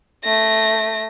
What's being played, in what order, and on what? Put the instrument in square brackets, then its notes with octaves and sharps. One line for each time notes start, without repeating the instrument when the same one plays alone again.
[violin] A3 A#6